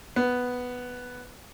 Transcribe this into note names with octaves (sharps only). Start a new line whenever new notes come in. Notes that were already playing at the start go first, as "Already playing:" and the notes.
B3